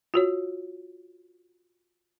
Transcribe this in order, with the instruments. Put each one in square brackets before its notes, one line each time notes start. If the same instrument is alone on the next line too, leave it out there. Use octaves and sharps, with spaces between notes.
[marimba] F4 F#4 C#5